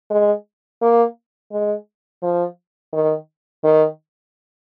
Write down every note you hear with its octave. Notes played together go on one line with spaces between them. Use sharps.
G#3
A#3
G#3
F3
D#3
D#3